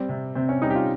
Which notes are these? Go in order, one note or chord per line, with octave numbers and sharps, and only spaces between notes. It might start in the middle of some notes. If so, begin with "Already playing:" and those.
Already playing: G3 C4
C3
C3 C4
C#4
G3 D#4
G4
F4